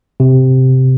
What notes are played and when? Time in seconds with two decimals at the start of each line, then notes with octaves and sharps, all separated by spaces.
0.20 C3